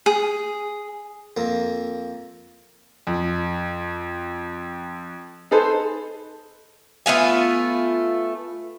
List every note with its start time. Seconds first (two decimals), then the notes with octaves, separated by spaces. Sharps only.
0.06 G#4
1.37 F2 A#3
3.07 F2
5.51 D#4 G#4 A4 B4 C5
7.06 A3 B3 F4 G#5